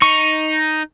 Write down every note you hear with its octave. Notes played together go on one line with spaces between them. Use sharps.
D#4 C#6